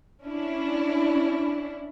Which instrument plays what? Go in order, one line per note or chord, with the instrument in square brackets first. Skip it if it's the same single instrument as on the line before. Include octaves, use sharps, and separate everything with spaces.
[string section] C#4 D4 E4